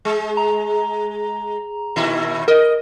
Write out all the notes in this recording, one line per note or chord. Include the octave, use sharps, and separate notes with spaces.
G#3
A#5
A#2 D#3 E4
A#4 D#5